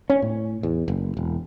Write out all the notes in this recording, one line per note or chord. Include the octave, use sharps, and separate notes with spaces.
C#4
A2
E2
F#1
E1